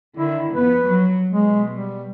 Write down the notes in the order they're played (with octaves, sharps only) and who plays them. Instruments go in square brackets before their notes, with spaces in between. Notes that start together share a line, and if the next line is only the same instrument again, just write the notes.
[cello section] D3 D#3 [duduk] E4
[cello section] F2 B3 [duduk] B4
[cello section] F#3
[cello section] B2 [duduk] G#3
[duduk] G3